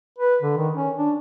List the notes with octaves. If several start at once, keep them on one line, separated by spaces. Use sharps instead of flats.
B4
D3
D#3
C#4
D4